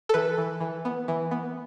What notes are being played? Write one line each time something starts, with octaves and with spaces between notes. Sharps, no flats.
A4
E3 B4
E3
E3
B3
E3
B3